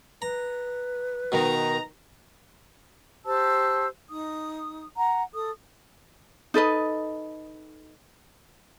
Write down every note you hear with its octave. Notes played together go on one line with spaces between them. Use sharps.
B4 A#5
B2 D#3 D#4 A#5
G4 C5 A5 E6
D#4 D#6
F#5 A#5
A4 D#6
D#4 A4 B4 D#5